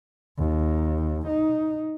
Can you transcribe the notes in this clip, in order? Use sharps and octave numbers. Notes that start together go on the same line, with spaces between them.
D#2
D#4